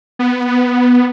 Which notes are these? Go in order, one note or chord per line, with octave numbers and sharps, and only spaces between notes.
B3